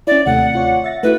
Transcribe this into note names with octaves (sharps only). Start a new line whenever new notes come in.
C#4 E4 D5
D#2 C3 A3 F#5
F4 C#5 D5
E5 A6 A#6
A3 E4 F#4 B4